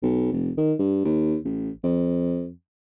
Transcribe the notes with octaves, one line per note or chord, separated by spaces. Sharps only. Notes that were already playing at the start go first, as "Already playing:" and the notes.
B1
F1
D#3
G2
D#2
A1
F2